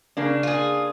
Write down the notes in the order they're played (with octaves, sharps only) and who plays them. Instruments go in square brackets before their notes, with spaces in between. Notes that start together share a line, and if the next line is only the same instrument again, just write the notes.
[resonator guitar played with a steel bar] C#3 A#3 D4
[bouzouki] F4 G#4